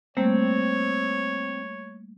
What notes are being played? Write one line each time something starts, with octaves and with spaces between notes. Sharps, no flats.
G3 A3 A#3 C4 C#5